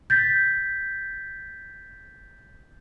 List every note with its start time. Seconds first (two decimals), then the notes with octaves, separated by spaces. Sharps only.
0.10 G6 A6 B6